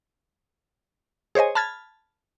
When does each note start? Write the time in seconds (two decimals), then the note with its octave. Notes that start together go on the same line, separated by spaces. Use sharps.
1.35 G#4 C5 C#5 D#5 G#5
1.55 A5 B5 F6 G#6 A6